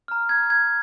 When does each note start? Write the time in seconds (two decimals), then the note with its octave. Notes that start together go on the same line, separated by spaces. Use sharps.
0.08 A#5 F6
0.29 G#6
0.50 G#6